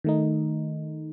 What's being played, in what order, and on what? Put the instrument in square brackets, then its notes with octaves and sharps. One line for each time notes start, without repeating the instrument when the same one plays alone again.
[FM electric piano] D#3 A3 D#4